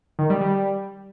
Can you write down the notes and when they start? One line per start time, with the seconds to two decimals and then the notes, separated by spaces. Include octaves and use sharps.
0.19 D#3
0.30 G3
0.41 G3